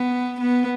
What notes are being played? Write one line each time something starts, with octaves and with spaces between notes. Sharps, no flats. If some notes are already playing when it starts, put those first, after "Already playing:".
Already playing: B3
B3